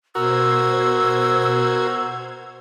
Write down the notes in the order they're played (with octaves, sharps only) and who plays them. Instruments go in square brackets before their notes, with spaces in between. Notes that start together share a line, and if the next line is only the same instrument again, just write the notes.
[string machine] B2 C5 G#6 [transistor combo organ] F#4 A#4 [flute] E6